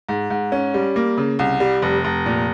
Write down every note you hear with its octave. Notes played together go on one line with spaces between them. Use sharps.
G#2
G#2
C#4
G3
A#3
C#3
C2
G3
F1
F1
A#2